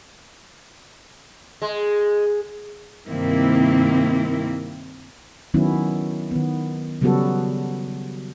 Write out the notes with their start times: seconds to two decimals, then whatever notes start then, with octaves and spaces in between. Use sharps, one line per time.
1.62 G#3
3.09 G2 C3 D#3 A#3 C4 E4
5.54 D#3 F#3 B3 C#4 E4
6.31 D#3 B3
7.01 C#3 F#3 G3 B3 F#4 A4